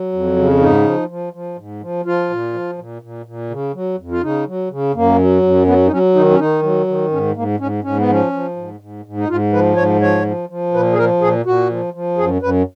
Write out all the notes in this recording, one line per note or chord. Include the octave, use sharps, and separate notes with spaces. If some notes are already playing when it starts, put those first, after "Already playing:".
Already playing: F#3
F2
C#3
G#2 D#4
F3
F3
F3
G#2
F3
F3 F4
A#2
F3
A#2
A#2
A#2
C#3
F#3
F2
F4
C#3 D#4
F#3
C#3
F#2 A#3
F#3
F#2
F#3 B3
D#4
F#3 C#4
D#3 D#4
C#4
D#3 D#4
F#3
D#3
G#2 C#4
G#2 A#3
G#2 C#4
G#2 C#4
B3
F3 C#4
F3
G#2
G#2
G#2
D#4
G#2 F4
F3 B4
G#2 C#5
F3 C#5
F3
F3
A#2 B4
G#4
F3 A#4
A#2 G#4
A#2 F#4
F3
F3
F#2 G#4
F#2 B4